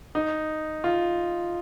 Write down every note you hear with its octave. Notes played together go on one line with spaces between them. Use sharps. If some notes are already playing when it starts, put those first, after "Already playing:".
D#4
F4